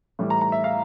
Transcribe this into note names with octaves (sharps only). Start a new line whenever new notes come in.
A2 E3 G3
A#5
A#5
E5
F5